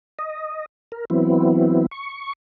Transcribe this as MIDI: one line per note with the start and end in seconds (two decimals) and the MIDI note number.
0.19 0.66 75
0.92 1.05 70
1.10 1.86 52
1.10 1.86 54
1.10 1.86 59
1.10 1.86 60
1.10 1.86 64
1.91 2.33 85